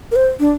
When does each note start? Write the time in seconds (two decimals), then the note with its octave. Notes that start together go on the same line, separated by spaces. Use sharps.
0.12 A#4
0.16 C5
0.40 D4